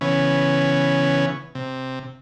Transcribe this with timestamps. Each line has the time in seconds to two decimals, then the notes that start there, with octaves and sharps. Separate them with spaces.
0.01 C#3 E3 B3 C#4
1.55 C3